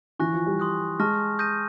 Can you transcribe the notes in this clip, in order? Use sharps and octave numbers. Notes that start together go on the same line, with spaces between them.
E3 G#5 C#6 F#6 A#6
F3
G3
C6 D#6 F#6
G#3 A5 C#6 F6 A#6
D#6 G6 A#6 D#7